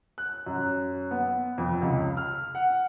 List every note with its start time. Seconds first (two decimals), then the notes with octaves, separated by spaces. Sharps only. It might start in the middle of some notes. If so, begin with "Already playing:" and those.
0.18 F#6
0.46 F#2
1.11 B3
1.58 F2
1.82 C#2
2.17 F6
2.55 F#5